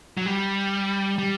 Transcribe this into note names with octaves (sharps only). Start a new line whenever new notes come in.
F#3
G3
G3